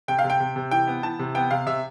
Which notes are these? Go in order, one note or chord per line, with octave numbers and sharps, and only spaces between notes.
C3 G5
F5
C3
G5
C3
C3
E3 G5
B3
E3 A5
C3
B3 G5
C3 F5
C3 E5